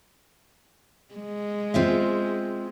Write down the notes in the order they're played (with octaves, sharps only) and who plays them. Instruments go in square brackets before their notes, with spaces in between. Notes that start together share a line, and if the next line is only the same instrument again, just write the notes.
[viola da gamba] G#3
[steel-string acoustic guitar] C4 F4 E5